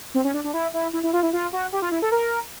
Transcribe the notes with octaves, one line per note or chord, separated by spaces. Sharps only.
C4
C#4
D4
D4
E4
E4
E4
E4
F4
E4
F4
F#4
G4
F4
E4
A4
A#4